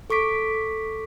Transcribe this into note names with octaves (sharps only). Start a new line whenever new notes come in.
A4 C#6 D6 B6 D7